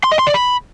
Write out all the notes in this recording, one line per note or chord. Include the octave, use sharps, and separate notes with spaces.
C6
D#5
C6
D5
B5